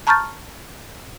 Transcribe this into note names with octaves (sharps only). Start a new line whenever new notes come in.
A5 A#5 C#6 F6 G6 A6